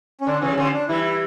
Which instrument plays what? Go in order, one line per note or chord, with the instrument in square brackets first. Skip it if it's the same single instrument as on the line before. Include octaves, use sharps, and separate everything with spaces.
[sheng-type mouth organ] C#4
[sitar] D3 [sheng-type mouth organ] D4
[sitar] C#3 E3 [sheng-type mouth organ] C#4
[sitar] G3
[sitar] D3 F3 [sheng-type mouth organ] C#4
[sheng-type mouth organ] D4
[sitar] E3 G3 [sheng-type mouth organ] E4
[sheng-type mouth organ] E4